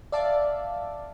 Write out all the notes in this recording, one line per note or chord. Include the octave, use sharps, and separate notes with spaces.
D5 E5 F5 A5 D6